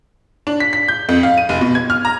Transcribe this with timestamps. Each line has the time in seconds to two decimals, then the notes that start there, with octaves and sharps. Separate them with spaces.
0.47 D4
0.60 B6
0.73 B6
0.88 G6
1.09 F2
1.23 F5
1.38 D#7
1.49 F1
1.61 B2
1.75 G#6
1.90 F6
2.05 A#5